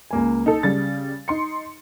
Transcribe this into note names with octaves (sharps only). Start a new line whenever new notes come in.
C#2 A#3 G#5
D#4 A4
C#3 G3 A6
D#4 C6 C#7